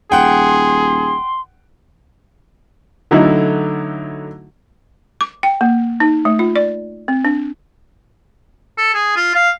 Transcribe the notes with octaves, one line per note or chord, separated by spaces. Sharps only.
D#1 G#4 F#5 G5 C6
D3 F#3 A3 D#4 E4
D6
G5
A#3
D#4
A3
F4
D5
C4
D4
A4
G#4
F4
F5